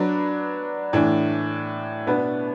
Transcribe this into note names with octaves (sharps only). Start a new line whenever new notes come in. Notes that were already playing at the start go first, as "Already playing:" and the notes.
Already playing: F#3 D4 B4 D5
A2 E3 D4
B2 B3 D4 B4